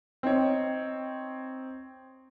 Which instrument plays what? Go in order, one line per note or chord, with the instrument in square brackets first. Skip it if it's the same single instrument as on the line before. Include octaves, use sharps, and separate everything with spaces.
[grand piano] C4 D#4 C#5